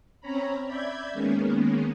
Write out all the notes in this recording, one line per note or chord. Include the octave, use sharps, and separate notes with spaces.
C4 C#4 C#5 A#5 B5
D5 E5 B5 G6 G#6
D#3 G#3 A#3 B3 C#4